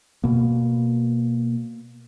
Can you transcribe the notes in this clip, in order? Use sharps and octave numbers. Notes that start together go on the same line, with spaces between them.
B2 A#3